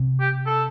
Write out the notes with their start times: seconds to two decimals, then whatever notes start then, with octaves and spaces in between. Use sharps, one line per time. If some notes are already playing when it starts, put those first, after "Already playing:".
Already playing: C3
0.20 G4
0.47 A4